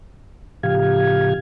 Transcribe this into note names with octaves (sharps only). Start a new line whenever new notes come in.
A2 C#3 F3 G4 F5 G#6